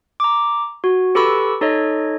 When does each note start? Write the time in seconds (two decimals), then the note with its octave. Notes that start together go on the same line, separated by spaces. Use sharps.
0.20 A#5 D6
0.84 F#4
1.15 G4 A4 B4 B5 C#6 E6
1.61 D#4 A4 C#5 D#5